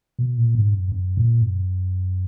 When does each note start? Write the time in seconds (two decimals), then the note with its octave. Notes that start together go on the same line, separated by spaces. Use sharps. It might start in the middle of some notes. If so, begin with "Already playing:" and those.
0.19 B2
0.37 A#2
0.55 G#2
0.73 F#2
0.92 F#2
1.17 A#2
1.42 F#2